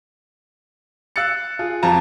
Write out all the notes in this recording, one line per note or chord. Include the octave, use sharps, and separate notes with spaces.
F5 E6 F#6 A6 C#7
F4 G#4
F2 F3 F4 A5 A#5